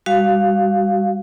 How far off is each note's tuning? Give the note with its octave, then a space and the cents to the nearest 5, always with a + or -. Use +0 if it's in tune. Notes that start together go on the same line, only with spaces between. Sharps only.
G3 +25 F#4 +20 F5 +0